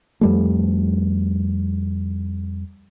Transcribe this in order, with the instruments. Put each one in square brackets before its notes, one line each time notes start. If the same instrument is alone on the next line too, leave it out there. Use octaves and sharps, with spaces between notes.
[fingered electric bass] F2 G3 A3